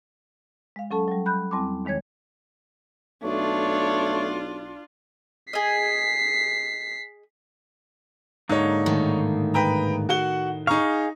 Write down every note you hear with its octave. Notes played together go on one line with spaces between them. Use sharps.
G#3 F5
F#3 C#4 A4 A5
F#3 G3
B5 F#6 G6
E2 G3 C4 A5 C6 D6
D#2 D#3 G#3 C#5 G#6
B1 A3 D4 F4 C#5
G#4 D#5 B6 C7
G#2 D3 A#3 D#4 C#5
A2 D#3
B4 G5 A#5
F#4 F#5 G7
D#4 G#4 F5 A#5 C#6